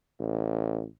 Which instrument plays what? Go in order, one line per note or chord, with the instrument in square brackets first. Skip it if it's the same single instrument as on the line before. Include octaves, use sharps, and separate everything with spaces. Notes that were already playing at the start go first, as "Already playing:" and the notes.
[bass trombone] A1